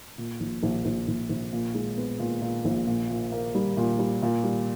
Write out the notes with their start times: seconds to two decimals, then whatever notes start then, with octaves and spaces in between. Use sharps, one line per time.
0.18 A#2
0.40 A#1
0.63 A#1
0.85 A#1
1.08 A#1
1.29 A#1
1.53 A#2
1.75 G#3
1.97 B3
2.19 A#2
2.42 A#2
2.65 A#1
2.87 A#2
3.10 A#2
3.32 A#3
3.55 G3
3.77 A#2
3.99 G3
4.22 A#2
4.44 G3